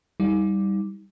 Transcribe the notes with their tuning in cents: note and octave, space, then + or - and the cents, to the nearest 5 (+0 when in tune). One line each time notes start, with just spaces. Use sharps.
G3 +0 D#4 +35